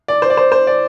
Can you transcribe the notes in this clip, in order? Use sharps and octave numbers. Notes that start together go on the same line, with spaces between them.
D5
C5
D5
C5
C5
D5